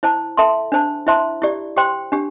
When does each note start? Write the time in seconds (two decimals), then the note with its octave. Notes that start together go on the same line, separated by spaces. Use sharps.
0.03 E4 C5 A5
0.37 A4 E5 A5 C6
0.72 D4 C5 A5
1.07 E4 C5 E5 A5 C6
1.42 E4 G4 D5
1.77 G4 C5 G5 C6
2.12 D4 G4